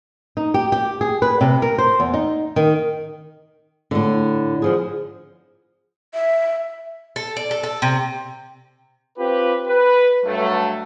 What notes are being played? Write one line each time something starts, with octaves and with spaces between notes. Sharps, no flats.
D#4
G4
G4
G#4
B4
C3
A#4
C5
E2
D#4
D#3
A2 D3
D3 F3 G#4
E5
A4
D5
A4
A4
C3
C4 F4 G4 B4
B4
G2 F#3 A3